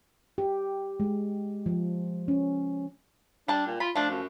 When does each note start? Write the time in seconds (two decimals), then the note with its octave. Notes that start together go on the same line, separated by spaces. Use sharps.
0.38 G4
1.00 G#3
1.66 F3
2.28 C#4
3.48 G3 D4 A5
3.66 A#2
3.80 F4 B5
3.96 F3 A3 D4
4.10 F#2